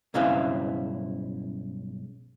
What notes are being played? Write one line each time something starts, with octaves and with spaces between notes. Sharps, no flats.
B1 G2 C#3 C4 E4 F5